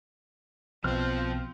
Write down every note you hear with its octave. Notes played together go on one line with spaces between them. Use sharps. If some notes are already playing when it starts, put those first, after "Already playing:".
B1 B2 F3 C4 C5 F6